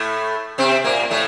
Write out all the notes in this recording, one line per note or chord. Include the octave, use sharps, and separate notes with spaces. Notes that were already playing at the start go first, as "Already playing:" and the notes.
Already playing: A2 A3
C3 C4
A#2 A#3
A2 A3